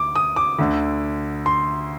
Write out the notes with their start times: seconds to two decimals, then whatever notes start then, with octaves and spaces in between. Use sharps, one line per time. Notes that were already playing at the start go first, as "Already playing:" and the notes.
Already playing: D2 D6
0.15 D#6
0.36 D6
0.59 D2 D3
1.46 C6